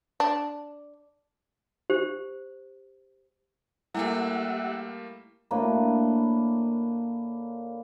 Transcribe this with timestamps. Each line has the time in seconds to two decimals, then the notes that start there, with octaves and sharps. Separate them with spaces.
0.20 D4
1.90 G4 C5
3.95 G3 A3 A#3 E4 G4 E5 F#5 G#5
5.51 A2 A#3 D4 B4